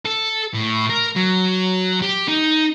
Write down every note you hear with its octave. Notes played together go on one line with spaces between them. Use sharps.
A4
A2
A#4
F#3
G4
D#4